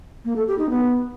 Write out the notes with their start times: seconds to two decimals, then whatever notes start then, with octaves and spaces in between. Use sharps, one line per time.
0.25 A#3
0.36 A4
0.47 G4
0.59 D#4
0.70 B3